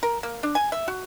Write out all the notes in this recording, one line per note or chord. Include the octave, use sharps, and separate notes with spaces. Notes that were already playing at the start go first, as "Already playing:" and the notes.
A#4
A#3
D4
G#5
E5
F#4